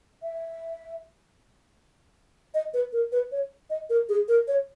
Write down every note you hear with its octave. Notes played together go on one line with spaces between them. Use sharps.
E5
D#5
B4
A#4
B4
C#5
D#5
A#4
G#4
A#4
C#5